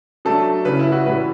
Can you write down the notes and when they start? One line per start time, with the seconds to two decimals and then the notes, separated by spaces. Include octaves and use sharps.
0.25 F#3 A3 D4 A4
0.65 C#3 G3 C#4 E4 B4
0.79 E4
0.92 F#4
1.06 A2 E3 G3 B4